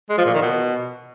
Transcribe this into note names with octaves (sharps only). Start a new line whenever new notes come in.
G#3
F3
A#2
D#3
B2